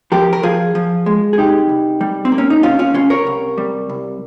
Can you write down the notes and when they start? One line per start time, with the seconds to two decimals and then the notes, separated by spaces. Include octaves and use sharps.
0.12 F3 G4 A#4
0.33 A#4
0.43 F3 F4 G#4
0.75 F3
1.06 G#3
1.33 G#4
1.38 C2 D#4 G4
1.69 C2
2.01 G3
2.25 C4
2.32 A#3
2.38 C#4
2.50 D#4
2.63 C2 C#4 F4
2.79 C#4 F4
2.94 C2 C#4 F4
3.10 A#4 C#5
3.26 C2
3.58 G3
3.89 C2